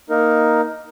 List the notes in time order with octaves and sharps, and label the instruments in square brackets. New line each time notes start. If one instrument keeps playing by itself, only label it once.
[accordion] A#3 D#4 A#4